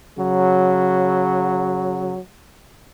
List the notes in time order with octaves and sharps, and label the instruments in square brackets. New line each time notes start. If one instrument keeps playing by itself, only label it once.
[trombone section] C#3 F#3